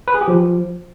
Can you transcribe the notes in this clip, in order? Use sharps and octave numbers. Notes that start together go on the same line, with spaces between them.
B4
G#4
G4
F3